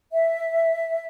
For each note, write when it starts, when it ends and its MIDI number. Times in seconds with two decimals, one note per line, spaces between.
0.11 1.07 76